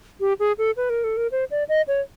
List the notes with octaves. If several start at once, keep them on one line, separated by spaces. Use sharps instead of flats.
G4
G#4
A4
B4
A#4
A4
A#4
C5
D5
D#5
C#5